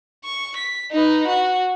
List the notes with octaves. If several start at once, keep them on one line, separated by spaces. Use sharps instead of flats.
C#6
B6
D#4 B4
F#4